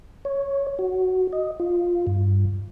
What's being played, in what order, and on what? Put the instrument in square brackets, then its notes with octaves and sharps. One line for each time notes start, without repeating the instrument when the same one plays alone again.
[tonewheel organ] C#5
F#4
D#5
F4
G2